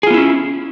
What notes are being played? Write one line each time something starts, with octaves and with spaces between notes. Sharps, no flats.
B3 C#4 E4 F4 G#4